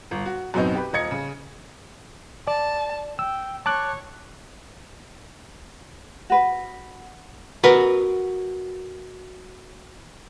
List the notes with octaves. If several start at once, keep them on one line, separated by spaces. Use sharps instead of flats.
G1
F#4
F#2 B2 B3 C4 D#4
G4 B4
D#1 D#5 G#6 C#7
C#3
D5 A5
G5 E6
C#5 A5 D6 F#6
F#4 B4
F#4 A#4 B4